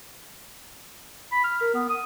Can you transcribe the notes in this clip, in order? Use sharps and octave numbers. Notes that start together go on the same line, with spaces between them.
B5
F6
A#4
B3
D#6